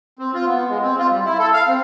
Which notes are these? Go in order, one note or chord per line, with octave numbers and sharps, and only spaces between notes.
C4
F4
B3
G#3
C4
F4
G3
E4
A4
F5
C4